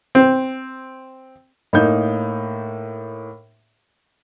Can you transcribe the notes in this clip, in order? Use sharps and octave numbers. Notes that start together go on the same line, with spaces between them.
C4
A2 A#3 D#4 G6